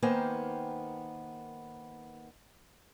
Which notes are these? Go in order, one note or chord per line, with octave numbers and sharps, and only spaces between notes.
D#3 A#3 B3 C5 G5 G#5